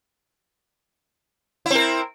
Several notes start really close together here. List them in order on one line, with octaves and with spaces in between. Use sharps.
E4 C4 A#4